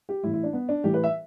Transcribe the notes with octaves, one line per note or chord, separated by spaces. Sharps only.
G4
A2 E3 E4
E4
D4
B3
D4
A2 E3 G4
B4
E5